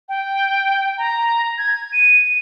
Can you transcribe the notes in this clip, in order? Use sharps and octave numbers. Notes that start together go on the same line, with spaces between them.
G5
A#5
G#6
D#7